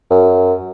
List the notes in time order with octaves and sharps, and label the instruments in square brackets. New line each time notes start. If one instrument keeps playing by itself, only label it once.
[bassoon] F#2